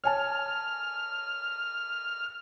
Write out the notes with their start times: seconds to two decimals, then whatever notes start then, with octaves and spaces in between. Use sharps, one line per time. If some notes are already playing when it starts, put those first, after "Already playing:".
0.04 C#5 G#5 A5 F6